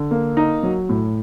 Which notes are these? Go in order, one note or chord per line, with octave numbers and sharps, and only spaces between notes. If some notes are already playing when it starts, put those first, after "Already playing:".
Already playing: D3
A#3
D#4
F#3
A2